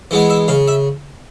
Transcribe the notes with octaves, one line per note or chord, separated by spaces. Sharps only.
E3 G#3 B3
E5
C#3 F5
E5